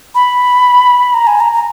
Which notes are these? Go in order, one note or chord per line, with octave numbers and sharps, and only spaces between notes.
B5
A#5
G#5
A#5
A#5